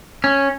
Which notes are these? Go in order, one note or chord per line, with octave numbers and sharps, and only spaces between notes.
C#4